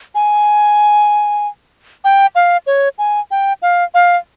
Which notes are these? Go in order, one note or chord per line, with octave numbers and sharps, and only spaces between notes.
G#5
G5
F5
C#5
G#5
G5
F5
F5